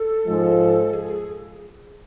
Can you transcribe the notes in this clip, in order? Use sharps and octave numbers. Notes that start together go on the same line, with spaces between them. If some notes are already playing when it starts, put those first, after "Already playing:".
Already playing: A4
G#2 F3 G#3
G#4